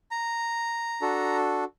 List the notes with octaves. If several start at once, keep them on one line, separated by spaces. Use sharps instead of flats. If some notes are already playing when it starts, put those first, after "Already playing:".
A#5
D4 F#4 A4